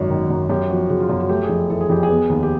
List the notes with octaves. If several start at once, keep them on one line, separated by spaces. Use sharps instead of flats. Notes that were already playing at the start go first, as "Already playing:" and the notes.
Already playing: G#1 F#2 F#4
D#3
F#2
F#2 G4
F3 F#4
C#3 F#4
F4
F#2 F#4
F#4
A3 G4
G#4
F2
E3 A4
G#4
F2 G4
G#4
B3
D#2
G4